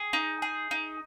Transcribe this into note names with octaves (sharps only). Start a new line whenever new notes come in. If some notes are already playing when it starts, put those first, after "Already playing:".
Already playing: G#4
D#4
G#4
D#4